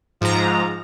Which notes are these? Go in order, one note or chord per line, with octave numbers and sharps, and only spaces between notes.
G#2 F3 A#5